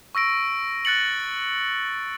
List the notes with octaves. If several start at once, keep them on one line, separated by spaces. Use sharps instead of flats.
C#6 E6 A#6 D7
F#6 A6 C#7 F#7